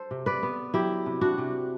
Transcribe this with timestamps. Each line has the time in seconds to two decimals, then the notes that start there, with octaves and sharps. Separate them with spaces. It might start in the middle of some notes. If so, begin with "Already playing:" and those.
Already playing: A4 C5
0.11 C3
0.26 B4 D5
0.43 B3
0.74 F#3 E4 G4
1.06 C3
1.21 D4 F#4
1.38 C3